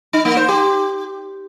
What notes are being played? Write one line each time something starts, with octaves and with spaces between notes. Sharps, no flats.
D#4
A#3
C5
G4